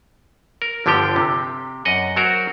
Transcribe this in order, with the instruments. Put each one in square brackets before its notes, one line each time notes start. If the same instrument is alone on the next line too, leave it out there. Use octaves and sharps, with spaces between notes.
[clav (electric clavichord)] A#4
G1 D3 F3 G4 G5
C3
F#2 D#5 F#5
F#3 F#4 A#4 C5